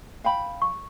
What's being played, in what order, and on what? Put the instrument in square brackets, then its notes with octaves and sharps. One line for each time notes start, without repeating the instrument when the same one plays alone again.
[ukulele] F5 G5 B5
[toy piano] C#6